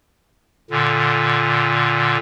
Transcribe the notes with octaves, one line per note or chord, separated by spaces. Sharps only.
A#2 D3